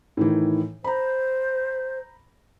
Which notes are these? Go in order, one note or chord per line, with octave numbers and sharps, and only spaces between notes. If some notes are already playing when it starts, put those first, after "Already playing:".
A2 D#3 E3
C5 A#5 B5